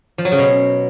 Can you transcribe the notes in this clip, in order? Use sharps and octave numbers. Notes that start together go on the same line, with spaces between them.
F3
F#3
C#3
B2